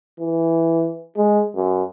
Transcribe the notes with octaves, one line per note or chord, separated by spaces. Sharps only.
E3
G#3
F#2